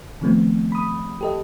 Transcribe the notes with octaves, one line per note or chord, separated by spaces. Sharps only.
C3 D#3 F3 A3 B3 C4
B5 D#6
G4 A4 D#5